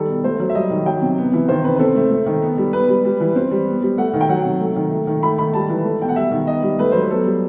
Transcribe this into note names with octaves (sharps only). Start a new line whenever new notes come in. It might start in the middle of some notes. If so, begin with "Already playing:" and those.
Already playing: D#3 G3 A4
B2
A3 C5
F#3
E5
G3 D#5
D#3
F#3 G5
C3
B3
E3
D#3 C5
C3 B4
B4
C4 A4
A3
A3
D#3
B3
G3
B3 B4
G3
G3
E3
C4
G3
B3
G3
A3 F#5
D#3
G5
F#3 F#5
C3
A3
D#3
A3
D#3
A3 B5
D#3 B5
G3 A5
E3
A3
B2 G5
F#5
G3 E5
D#3
B3 D#5
G3
A3 B4
F#3 C5
B4
B3 A4
G3